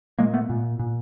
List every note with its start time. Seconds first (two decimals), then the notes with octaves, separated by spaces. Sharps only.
0.19 A#2 G#3 A#3
0.34 A3 B3
0.50 A#2
0.79 A#2